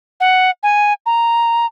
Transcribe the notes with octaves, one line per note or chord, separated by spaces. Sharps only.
F#5
G#5
A#5